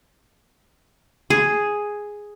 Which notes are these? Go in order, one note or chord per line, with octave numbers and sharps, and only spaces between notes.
G#4